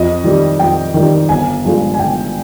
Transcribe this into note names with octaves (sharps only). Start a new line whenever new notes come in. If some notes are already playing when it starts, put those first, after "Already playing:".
Already playing: F2 D#5
D#3 G3
F2 G5
D#3 G3
G1 G#5
G2 F3 G#3
G#5
G1 G5